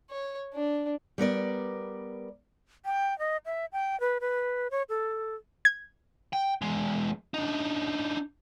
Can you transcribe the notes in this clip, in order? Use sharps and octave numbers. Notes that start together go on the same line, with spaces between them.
C#5
D4
G3 B3 A#4 D5
G5
D#5
E5
G5
B4
B4
C#5
A4
G#6
G5
E2 G#3
D4 D#4